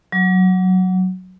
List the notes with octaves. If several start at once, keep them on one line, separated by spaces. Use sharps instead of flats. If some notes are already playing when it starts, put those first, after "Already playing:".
F#3